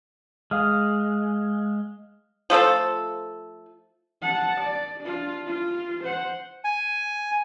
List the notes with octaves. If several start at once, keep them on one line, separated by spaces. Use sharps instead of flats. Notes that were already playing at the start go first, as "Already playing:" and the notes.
G#3 F5 D#6 F6
F3 A3 A4 C5
F#5 A5
D5
D4 F4
F4
C5 F#5
G#5